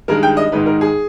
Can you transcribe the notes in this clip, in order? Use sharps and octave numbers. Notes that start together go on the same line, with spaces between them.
G2 D#3 G#3 A#4
G5
D#5
G#2 D#3 G#3 D#4 B4
A#4
G#4